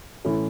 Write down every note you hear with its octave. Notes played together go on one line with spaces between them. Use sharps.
A2 E3 A3 C#4 E4